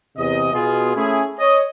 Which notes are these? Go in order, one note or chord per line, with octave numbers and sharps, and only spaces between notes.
E2 C3 D#5
B2 B3 F4 G#4
A3 C#4 E4 G#4
C#5 D#5